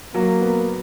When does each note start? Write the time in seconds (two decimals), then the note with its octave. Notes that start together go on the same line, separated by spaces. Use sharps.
0.14 F#3 A#3
0.41 B3